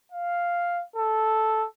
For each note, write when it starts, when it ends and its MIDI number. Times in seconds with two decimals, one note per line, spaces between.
0.12 0.84 77
0.96 1.66 69